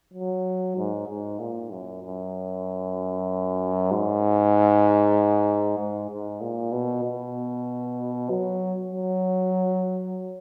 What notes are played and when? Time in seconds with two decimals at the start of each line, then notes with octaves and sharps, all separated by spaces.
0.13 F#3
0.77 G#2
1.08 G#2
1.40 A#2
1.71 F#2
2.02 F#2
3.91 G#2
5.79 G#2
6.10 G#2
6.41 A#2
6.72 B2
7.04 B2
8.30 F#3
8.92 F#3